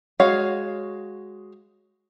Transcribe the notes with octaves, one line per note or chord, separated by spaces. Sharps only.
G#3 F#4 C#5 F5